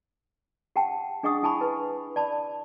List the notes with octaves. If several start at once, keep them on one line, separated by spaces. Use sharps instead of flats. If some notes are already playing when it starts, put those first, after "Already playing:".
G4 F#5 G5 A5
D4 G#4 D#5 F#5 C#6 D#6
E4 G#5 A5 B5 C#6
E4 B4
D5 A5 B5